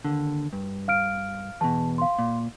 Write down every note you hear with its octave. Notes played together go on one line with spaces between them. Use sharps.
D#2 D3
G2
F5 F6 D7
E2 B2 A5
F5 C6
A#2